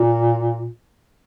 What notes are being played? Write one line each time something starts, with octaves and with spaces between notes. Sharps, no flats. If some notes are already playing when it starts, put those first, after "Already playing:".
Already playing: A#2